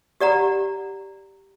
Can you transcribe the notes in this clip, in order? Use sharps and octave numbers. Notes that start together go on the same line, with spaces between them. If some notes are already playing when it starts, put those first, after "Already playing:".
G4 D5 F#5 A#5